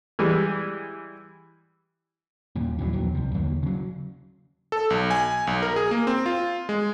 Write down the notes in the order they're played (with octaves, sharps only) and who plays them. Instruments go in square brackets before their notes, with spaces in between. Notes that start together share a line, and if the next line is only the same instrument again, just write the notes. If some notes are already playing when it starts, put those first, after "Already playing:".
[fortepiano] E3 G3 G#3
[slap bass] D#2 A#2
E2 A2 D#3 F#3
A#1 D#2 D#3 F#3
C2 C3
D#2 D3 D#3
C#3 F#3
[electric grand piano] A4
B1
G#5
B1
A#4
G#4
A#3
C4
F4
G#3